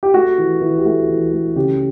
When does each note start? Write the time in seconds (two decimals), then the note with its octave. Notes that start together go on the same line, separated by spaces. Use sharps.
0.03 G4
0.14 A3 F#4
0.38 E3
0.61 E3
0.78 G4
0.85 A3 F#4
1.09 E3
1.32 A3
1.56 C#3 G4